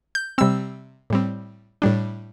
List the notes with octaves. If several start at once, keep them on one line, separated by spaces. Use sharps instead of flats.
G6
C3 G3 C4 E6
A2 G3 C4
A2 G3 D4